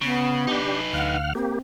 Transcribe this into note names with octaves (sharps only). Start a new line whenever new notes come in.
C#3 B3
D4 D#4 G4 B4
D2 F5 F#5 F6
A#3 C4 G4